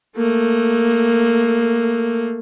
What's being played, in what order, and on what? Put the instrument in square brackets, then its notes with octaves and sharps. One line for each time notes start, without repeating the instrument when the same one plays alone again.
[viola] A3 A#3